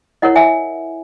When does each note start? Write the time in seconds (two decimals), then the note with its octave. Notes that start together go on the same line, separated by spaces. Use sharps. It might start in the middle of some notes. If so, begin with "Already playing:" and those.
0.22 E4 A#4 C#5 D#5 F#5
0.36 E5 G#5